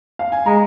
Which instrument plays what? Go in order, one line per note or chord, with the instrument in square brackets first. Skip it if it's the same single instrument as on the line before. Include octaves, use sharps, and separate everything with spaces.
[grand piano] F5
G#5
[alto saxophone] G#3 [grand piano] A#5